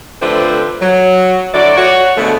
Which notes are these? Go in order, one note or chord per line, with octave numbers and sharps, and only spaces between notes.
D3 F3 A3 C4 B4 C5
F#3
D3 F#3 E4 F#4 D5
F#4 C#5
B2 D3 F3 G#3 A3